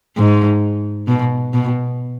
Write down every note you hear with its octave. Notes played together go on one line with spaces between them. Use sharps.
G#2
B2
B2